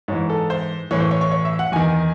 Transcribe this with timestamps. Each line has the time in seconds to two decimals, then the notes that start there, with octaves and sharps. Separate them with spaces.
0.08 G#2 E3 C#5
0.30 A4
0.50 C5
0.91 A2 E3 C#5
1.00 C5
1.11 C#5
1.21 C#5
1.32 C#5
1.45 E5
1.59 F#5
1.72 E2 D#3 G#5